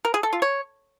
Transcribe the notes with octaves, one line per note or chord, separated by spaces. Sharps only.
A#4
G#4
A4
F4
C#5